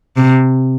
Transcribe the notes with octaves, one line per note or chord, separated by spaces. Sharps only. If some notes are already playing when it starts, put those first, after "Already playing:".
C3